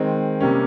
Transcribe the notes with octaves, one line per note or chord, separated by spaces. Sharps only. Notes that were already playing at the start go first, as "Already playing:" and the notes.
Already playing: D#3 G#3 C4
C3 G3 A#3 C#4